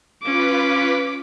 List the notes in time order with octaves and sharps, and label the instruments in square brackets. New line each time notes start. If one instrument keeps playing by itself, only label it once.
[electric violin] C#4 D6 [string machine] F4 B4 B6